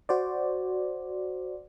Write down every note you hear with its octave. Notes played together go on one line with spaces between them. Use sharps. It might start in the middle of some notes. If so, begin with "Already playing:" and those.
F#4 C5 D5